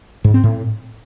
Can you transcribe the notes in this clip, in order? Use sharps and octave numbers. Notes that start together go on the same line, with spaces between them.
G#2
C4
A2